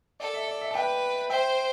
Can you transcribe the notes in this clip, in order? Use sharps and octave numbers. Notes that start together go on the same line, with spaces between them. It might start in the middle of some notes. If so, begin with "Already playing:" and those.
A4 D5
E5
D5
E5
A5
B4 E5 G5
C5 E5 G5